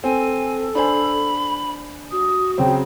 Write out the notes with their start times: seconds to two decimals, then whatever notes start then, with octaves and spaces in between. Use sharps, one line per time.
0.04 C4 A4 G#5
0.75 D4 C5 G#5 B5
2.12 F#4 D#6
2.58 C#3 F#3 C4 G5